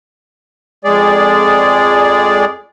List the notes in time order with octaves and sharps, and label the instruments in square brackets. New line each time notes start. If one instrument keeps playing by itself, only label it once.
[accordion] F2 G#3 G#4 D5